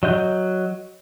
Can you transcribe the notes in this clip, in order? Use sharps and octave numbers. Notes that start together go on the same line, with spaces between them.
F#3 D#5 G6